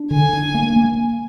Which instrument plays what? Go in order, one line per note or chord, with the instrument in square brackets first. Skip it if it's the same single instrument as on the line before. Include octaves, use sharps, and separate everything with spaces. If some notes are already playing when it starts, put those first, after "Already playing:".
Already playing: [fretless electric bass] D4
[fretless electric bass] D3 [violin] G#5
[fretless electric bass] D4
A#3
A#3